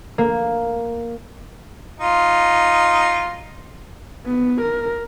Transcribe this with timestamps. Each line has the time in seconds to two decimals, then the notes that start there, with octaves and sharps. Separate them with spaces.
0.18 A#3
2.00 D#4 F4
4.26 B3
4.61 A#4